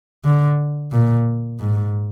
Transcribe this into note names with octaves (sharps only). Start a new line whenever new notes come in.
D3
A#2
G#2